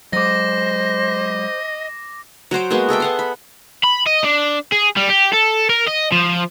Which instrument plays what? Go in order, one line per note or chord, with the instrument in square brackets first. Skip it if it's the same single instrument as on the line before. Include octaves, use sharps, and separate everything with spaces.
[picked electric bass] F#3 G#3 [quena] C5 [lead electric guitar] D#5 [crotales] D6 A#6
[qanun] F#3 F#4 C5 D6
G#3 A#3 B3 F#4
G#4 A4 E5 G5
B3 F#5 C6
B5
[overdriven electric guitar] B5
D#5
D4
G#4
G3
G4
A4
A#4
D#5
F3